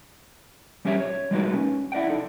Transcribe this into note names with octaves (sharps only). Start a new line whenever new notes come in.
G3 C#4 G4 C#5 E5
C#5
G3 G#3 A#3 D#4 F#4 B4
C#4
E4 D5 F#5 G5
D#4 A4